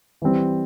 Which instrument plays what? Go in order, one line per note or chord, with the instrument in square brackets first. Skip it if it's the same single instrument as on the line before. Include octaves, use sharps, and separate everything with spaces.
[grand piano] E3 G3 C4